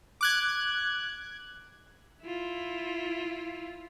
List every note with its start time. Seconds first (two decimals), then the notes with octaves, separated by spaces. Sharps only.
0.21 D6 F#6 G#6
2.22 E4 F4